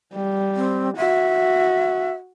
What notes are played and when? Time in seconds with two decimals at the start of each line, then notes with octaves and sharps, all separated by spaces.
0.14 G3
0.56 C4
0.97 F#4 E5